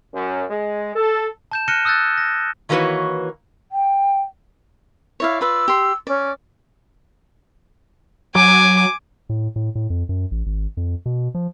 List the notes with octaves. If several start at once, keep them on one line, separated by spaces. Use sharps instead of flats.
F#2
G#3
A4
A5 G6 E7
F6 F#6 A#6 C#7 D#7 G7
D#6 E6 F#6 G6 A6
A#6
D#3 E3 A#3 F#4 B4 C#5
G5
E4 C#5 D5 F5
F4 B4 D5 E6
G4 C6
C#4 D5
F#3 G#5 D6
A2
A2
A2
F2
F#2
A1
G#1
F2
B2
F3